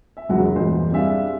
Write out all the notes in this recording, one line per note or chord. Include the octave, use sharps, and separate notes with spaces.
E5
E1 C2 F#3 G#3 F#4
E2 G2 A#2 C5 D#5
G3 C4 D4 G#4 E5 F5